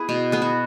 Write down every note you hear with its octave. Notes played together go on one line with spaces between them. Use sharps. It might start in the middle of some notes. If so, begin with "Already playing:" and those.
Already playing: B3 E4 G#4 B4
B2
B3 G#4
F#4